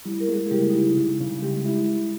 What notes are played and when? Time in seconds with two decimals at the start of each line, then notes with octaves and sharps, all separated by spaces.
0.05 G3 E4
0.20 A#4
0.28 G#3 A#3 G#4
0.46 E4
0.51 C#3 G3 G4
0.70 D#4
0.74 G3 E4
0.97 C#3
1.20 C#3
1.42 G3 G#3 G4
1.65 E4